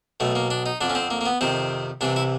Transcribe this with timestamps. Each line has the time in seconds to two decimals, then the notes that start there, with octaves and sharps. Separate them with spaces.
0.20 B1 B2 A3
0.35 A#3
0.51 D4
0.66 D#4
0.81 F2 D3 D4
0.90 C#4
0.95 C4
1.11 A#3
1.21 A#3
1.26 B3
1.41 F2 C3 D#3 C4
2.01 C2 C3 E3 D4
2.16 E4